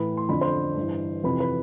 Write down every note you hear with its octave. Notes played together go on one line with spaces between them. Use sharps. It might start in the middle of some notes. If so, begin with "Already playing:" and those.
Already playing: A2 E3 B4 B5
C6
F2 D3 B5
C5 C6
G2 E3
F2 C3 E3 B4 B5
B4 B5